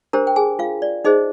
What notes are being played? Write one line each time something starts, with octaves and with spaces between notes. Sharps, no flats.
D4 G4 A#4 C5 A#5
G5
G#4 G#5
F4 F5
D5
D#4 G#4 C5 D#5